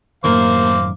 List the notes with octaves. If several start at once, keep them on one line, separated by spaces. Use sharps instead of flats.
F#2 A2 D#3 A#3 C5 F5 D6